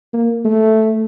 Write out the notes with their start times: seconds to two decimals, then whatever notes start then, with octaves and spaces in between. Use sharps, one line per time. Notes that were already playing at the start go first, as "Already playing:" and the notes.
0.13 A#3
0.45 A3